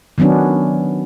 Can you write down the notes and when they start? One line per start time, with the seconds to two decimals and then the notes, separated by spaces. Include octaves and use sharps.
0.18 D#3 F#3 B3 C#4 D4